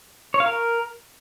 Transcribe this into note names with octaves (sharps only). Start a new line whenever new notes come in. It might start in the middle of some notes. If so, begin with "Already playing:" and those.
C#5
F5
A#4